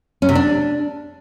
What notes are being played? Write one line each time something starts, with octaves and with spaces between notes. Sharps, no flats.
C#4
C3
D4